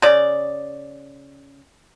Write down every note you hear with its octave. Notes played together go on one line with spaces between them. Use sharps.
C#3 D5